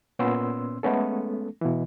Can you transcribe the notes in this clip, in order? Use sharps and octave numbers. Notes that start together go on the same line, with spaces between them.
A#2 B3 C#4 C6 E6
G#3 A3 B3 C#4 A4
B2 E3